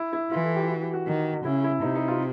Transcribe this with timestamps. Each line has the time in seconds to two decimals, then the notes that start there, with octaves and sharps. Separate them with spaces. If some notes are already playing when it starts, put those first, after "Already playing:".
Already playing: E4
0.13 E4
0.31 E3 F4
0.43 A4
0.56 G4
0.69 F#4
0.81 G4
0.94 F#4
1.07 D#3
1.45 C#3 E4
1.64 E4
1.82 C3 D#4
1.95 D#4
2.08 F4